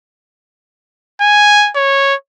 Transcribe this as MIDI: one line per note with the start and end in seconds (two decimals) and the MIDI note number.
1.21 1.71 80
1.76 2.15 73